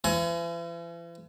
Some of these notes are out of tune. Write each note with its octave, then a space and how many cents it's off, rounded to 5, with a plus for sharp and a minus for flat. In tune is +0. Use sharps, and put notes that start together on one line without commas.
E3 +45 G#5 +25